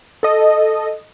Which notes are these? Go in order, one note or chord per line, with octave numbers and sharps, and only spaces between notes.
A4 D#5